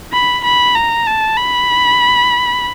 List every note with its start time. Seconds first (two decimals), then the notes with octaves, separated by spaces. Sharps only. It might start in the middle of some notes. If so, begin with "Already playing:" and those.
0.13 B5
0.44 B5
0.75 A#5
1.07 A5
1.38 B5